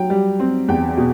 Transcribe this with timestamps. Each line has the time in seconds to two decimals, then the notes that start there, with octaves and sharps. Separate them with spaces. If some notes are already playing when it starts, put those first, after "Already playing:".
Already playing: F#3 G5
0.10 G3
0.39 C4
0.68 E2 G5
0.97 B2